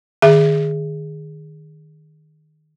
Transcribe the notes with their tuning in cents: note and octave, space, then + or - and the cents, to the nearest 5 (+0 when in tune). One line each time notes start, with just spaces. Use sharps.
D#3 -15 G#4 -5 E5 +20